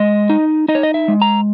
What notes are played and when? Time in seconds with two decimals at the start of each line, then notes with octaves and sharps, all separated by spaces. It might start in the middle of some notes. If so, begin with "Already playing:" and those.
Already playing: G#3 D#5
0.30 D#4
0.68 D#4 D#5
0.75 C#5
0.83 D#5
0.94 E5
1.08 G#3
1.22 A#5